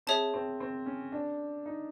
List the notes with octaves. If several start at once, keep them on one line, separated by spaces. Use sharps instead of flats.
C4 G#4 C#5 E5 A5
C4
C4
C#4
D4
D#4